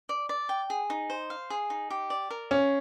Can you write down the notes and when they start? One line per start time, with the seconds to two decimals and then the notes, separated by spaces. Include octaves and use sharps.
0.09 D5
0.29 D5
0.49 G5
0.70 G#4
0.90 D#4
1.10 C5
1.30 F5
1.50 G#4
1.70 D#4
1.90 G4
2.10 D5
2.30 A#4
2.51 C#4 F5